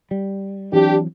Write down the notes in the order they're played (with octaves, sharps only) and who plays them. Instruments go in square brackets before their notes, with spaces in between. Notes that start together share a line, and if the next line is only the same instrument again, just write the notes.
[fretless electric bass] G3
[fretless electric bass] E3 F#3 C4 [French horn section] D4 G4